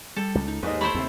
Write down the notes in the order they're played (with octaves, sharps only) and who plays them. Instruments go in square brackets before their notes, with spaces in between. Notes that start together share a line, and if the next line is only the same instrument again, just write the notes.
[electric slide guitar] G3 [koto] A4
[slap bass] C#2
[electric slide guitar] D#4
[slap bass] D#2 [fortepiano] G#2 D#5 [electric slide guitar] G#4 B4
[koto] A3 E4 C5 [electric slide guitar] G4 [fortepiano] B5
[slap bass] D#2 C3 [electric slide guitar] C4 A4